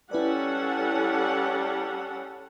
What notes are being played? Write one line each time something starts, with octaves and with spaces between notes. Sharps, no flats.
G3 C#4 E4 A4 B4 D5 F#5